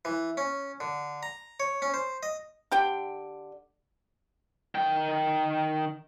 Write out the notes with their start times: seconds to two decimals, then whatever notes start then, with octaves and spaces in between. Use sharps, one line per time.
0.05 E3
0.37 C#4
0.80 D3
1.23 A#5
1.60 C#5
1.82 C#4
1.94 C5
2.23 D#5
2.72 D3 G4 G5
4.75 D#3 G5